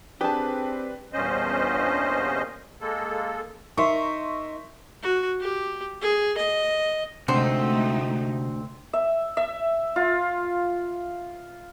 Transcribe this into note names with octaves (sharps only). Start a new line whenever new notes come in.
C4 D4 G4 G#4 B4 A5
E2 G2 A#2 C#4 C5 D#5
G#3 A#3 A4
D#4 A#4 E5 C6 C#6
F#4
G4
G#4
D#5
D2 G#2 C3 A3 C4 D#4
E5
E5
F4